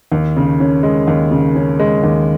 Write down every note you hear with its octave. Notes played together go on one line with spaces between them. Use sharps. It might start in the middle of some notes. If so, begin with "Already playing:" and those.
D#2
C#3
C#4
G#3
D#2
C#3
C#4
G#3
D#2